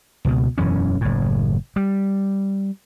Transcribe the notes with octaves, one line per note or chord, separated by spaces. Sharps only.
C#2 B2
E1 F#2 E3 C#4
F#1 A2
G3